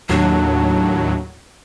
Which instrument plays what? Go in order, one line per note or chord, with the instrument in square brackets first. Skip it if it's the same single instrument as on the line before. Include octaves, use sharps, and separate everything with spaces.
[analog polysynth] D#2 A2 F#3 [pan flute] D4